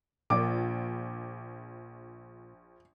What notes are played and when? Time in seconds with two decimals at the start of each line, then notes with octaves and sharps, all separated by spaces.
0.30 A#1 A#2 D6